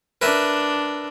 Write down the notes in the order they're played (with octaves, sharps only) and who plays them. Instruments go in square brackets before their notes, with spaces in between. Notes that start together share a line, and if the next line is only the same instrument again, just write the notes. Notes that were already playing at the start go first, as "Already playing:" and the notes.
[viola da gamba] D4 [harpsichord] A#4 B4 E5